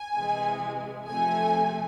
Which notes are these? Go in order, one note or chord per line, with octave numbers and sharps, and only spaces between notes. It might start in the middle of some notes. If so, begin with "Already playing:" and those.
Already playing: G#5
C3 E3 G#3
C3 F3 A3 G#5